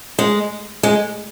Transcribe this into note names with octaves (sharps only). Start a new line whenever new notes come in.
G#3
G#3